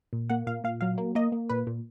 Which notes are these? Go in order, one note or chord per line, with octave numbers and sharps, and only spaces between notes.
A#2
A#3 F#5
A#2 F5
A#2 F5
F#3 F5
A#3
A#3 D#5
A#3
A#2 B4
A#2